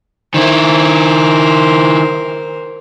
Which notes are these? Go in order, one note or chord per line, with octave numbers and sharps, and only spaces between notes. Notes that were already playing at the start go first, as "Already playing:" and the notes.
D#3 E4 A#4 C5